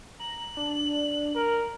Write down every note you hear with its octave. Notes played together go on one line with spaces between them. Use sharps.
A#5 F#7
D4
A#4